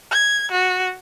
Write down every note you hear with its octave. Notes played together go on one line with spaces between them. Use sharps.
G#6
F#4